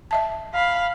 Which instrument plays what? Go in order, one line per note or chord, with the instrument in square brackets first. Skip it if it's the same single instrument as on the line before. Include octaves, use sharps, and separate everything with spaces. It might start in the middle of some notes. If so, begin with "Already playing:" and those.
[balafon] D#5 E5 A5
[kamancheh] F5 B5